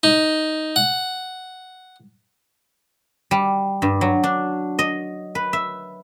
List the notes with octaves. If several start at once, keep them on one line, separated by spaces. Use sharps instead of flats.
D#4
F#5
G3
G2
F#3
D4
D#5
B4
E5